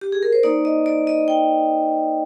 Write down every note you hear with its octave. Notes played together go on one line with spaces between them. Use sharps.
G4
G#4
A#4
C5
A#3 D#4 D5
D#5
D5
D#5
G5